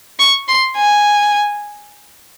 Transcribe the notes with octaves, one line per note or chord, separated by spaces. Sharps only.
C#6
C6
G#5